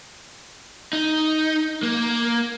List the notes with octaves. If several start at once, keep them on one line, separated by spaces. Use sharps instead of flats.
D#4
A#3